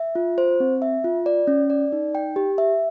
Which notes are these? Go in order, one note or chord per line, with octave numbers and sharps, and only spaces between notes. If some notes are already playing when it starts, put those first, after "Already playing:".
Already playing: E5
F4
C5
C4
E5
F4
D5
C#4
D5
D#4
G5
G4
E5